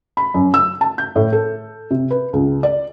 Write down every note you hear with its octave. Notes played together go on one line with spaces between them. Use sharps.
B5
F#2
E6
A5
G6
A2
A4
C3
B4
C#2
D5